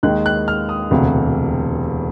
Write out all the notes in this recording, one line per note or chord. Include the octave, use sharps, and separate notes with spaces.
D#2 D#3 G#3 F#6
F#6
F6
D#6
E1 D2 C3